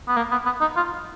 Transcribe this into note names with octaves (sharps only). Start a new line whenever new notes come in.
B3
A#3
B3
B3
D#4
F4